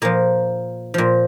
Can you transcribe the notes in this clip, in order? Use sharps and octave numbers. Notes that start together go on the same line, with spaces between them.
A#2 F3 A#3
A#2 F3